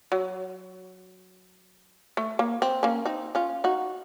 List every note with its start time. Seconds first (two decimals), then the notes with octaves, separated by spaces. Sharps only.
0.12 F#3
2.17 A3
2.39 A#3
2.62 C4
2.83 A#3 C#4
3.05 C4 D#4
3.35 C#4 F4
3.64 D#4 F#4